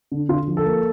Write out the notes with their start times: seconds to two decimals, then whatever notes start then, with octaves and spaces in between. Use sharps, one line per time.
0.12 D3
0.29 D3 F4
0.47 F3
0.57 A4
0.66 A#3